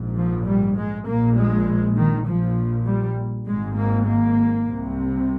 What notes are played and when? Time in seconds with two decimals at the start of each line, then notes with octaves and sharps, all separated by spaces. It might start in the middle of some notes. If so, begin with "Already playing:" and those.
Already playing: A#1 G#2
0.17 F3
0.47 G3
0.77 G#3
1.07 A#1 A#2 A#3
1.37 G#3
1.97 D#3
2.27 A#1 A#2 F3
2.86 G3
3.46 G#1 G#2 G#3
3.76 A#3
4.06 A#3
4.66 C2 C3